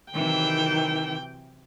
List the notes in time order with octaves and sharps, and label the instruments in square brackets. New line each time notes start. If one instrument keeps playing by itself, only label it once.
[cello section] C3 E3 F#3 [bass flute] D#3 [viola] G5